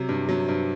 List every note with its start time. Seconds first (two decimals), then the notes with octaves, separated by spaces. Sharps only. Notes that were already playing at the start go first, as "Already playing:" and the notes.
Already playing: C3 F#3
0.09 G2
0.29 F#3
0.49 G2